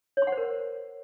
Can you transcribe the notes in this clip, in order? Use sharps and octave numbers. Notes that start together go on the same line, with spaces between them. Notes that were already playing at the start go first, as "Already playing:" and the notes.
C#5
C6
F#5
C5
A#4